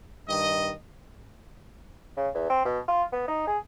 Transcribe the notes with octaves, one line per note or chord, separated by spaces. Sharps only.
G2 D#3 D#5
C#3
E2
C4
B2
F4
B3
D#4
G#4